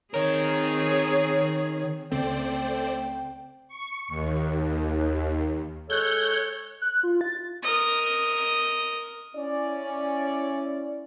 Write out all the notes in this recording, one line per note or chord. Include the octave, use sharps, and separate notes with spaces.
D#3 C4 G#4 A#4 C#5
C#2 C#3 A3 C4 C5 D5 G5
C#6
D#2
G#3 A4 C#5 F#6 G6
F#6
F4
A6
A#4 D#5
C#4 E4 D5